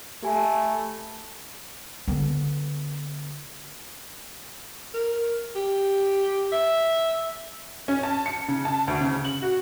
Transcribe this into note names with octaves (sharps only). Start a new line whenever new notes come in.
A3 G4 G#5 B5
D3 B3
A#4
G4
E5
C#4
A5
C#7
C#3
A5
D2
C#3
F#7
F#4